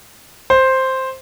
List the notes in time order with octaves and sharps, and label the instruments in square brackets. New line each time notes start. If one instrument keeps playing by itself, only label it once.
[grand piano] C5